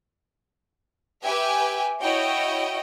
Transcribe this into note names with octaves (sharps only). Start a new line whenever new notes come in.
G4 B4 E5 G5 G#5
E4 F#4 C#5 D#5 G5